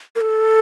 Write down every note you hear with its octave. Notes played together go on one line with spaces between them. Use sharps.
A#4
A4